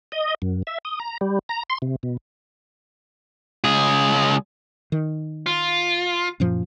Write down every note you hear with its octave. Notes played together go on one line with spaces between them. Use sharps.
D#5
F#2
E5
D#6
A#5
G3
A#5
C6
C3
B2
C#2 G#4
D#3
F4
F#2 A#2 F3